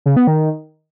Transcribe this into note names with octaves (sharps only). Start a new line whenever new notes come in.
C#3
B3
D#3